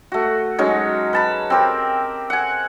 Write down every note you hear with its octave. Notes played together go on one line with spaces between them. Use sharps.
A3 F#4
F#3 G#3 C#4 D#4
B4 A5 B5
C4 G4 A#4
F#5 G#5